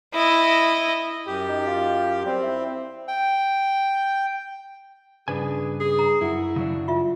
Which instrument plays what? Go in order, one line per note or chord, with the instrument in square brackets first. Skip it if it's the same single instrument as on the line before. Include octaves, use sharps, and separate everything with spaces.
[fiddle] E4 D#5
[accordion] F#2 G4
[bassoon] D#4
F4
[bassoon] G3 [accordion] C4
[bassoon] E4
[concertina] G5
[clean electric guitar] G2 A#2 C#3 [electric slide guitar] D4 B4 G#5 [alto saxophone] G#4
[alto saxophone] G#4
[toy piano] A#5
[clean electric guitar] F#2 F#4 F#5 [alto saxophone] E4
[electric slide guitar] C#3 F#3 D4
[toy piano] F4 E5